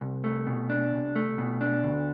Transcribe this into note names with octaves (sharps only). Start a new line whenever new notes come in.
C2
A3
B2
D4
C2
A3
B2
D4
D2